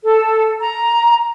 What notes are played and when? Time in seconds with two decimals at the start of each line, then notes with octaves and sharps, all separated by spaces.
0.04 A4
0.60 A#5